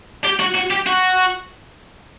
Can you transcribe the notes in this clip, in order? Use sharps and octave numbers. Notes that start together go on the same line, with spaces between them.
G4
F#4
F#4
G4
F#4